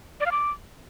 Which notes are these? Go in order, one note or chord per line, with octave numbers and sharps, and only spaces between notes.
D5
F5
D6